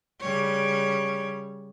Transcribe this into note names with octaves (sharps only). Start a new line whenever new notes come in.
C#3 G3 C#5